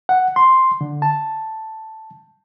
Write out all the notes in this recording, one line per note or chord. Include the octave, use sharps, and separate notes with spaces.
F#5
C6
D3
A5